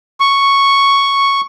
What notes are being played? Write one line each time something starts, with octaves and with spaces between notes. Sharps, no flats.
C#6